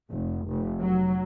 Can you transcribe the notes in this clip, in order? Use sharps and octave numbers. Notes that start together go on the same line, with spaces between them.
F1
F1
F#3